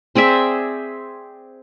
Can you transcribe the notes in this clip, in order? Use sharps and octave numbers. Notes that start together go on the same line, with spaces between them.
C4 G#4 D5 E5